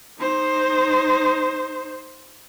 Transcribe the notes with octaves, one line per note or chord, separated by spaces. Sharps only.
D#4 C5